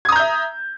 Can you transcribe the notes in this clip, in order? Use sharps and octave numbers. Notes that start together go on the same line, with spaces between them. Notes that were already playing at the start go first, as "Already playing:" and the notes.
E5 A#5 D#6 G6 G#6